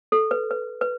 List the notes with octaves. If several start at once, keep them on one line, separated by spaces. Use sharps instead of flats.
A4
B4
B4
B4